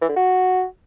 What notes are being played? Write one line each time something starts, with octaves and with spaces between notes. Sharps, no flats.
E3
D3
F#4